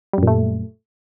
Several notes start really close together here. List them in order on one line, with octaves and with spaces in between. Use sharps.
G3 F#2 A#2 A3